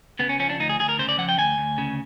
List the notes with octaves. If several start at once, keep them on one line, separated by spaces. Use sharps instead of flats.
C#3 B3
C#4
F3 C#4
D4
D2 D#4
G#4
D2 G#4
A#4
C#3 C5
D5
F3 F#5
G5
D2 G#5
D2
C#3